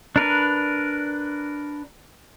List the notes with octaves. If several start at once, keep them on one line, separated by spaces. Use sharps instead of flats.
D4 A#4 B4